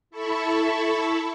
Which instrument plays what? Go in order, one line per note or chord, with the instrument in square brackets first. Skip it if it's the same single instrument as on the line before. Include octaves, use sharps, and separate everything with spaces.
[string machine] E4 A4 A5 B5 C#6